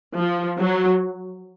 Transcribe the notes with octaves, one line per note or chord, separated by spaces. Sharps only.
F3
F#3